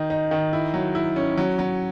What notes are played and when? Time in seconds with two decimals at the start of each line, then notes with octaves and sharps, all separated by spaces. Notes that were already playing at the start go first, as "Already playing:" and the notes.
Already playing: D#3 D#4
0.10 D#4
0.31 D#3
0.53 E4
0.74 F#3
0.95 E4
1.16 C#4
1.37 F#3
1.59 F#3